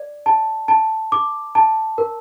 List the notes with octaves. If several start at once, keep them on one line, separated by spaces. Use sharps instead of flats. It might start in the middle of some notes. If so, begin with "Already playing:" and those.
Already playing: D5
A5
A5
D6
A5
A#4